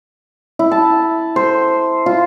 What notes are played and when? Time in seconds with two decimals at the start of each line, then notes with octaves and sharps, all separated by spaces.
0.59 E4
0.71 A5
1.36 C5
2.06 F4